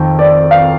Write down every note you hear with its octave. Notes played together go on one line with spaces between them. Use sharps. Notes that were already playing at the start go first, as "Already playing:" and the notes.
Already playing: F2 D#3 G5
D5
F5